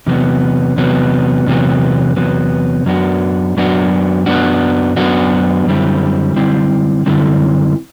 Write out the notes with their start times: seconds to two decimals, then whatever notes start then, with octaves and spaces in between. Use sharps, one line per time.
0.07 E2 C3 F#3 B3
0.76 E2 C3 F#3 B3
1.47 E2 C3 F#3 B3
2.16 E2 C3 F#3 B3
2.86 F#2 F#3 B3 D4 F#4
3.57 F#2 F#3 B3 D4 F#4
4.26 F#2 F#3 B3 D4 F#4
4.96 F#2 F#3 B3 D4 F#4
5.66 F#2 D3 G3 C4 E4
6.36 F#2 D3 G3 C4 E4
7.06 F#2 D3 G3 C4 E4